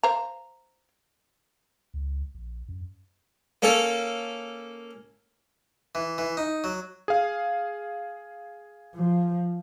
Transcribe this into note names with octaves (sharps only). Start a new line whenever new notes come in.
C5 F5 A#5
C#2
A#1
F#2
A#3 C#4 A4
E3
E3
D#4
F#3
G#4 F5
F3